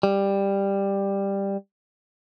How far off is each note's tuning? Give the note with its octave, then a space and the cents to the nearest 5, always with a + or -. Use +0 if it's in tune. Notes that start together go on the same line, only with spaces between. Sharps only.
G3 +10